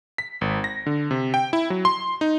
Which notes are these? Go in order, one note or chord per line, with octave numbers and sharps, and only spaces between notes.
B6
G#1
A#6
D3
C3
G5
E4
F#3
C6
D#4